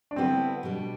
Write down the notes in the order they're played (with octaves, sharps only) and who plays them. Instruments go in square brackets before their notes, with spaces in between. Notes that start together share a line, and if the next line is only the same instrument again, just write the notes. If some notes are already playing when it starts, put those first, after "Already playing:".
[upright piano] D4
[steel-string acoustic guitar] D3 G3 B3 E4 [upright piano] C4
[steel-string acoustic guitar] B2 G3 D4